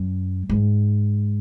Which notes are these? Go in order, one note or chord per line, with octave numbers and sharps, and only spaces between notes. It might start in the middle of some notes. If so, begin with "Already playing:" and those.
Already playing: F#2
G#2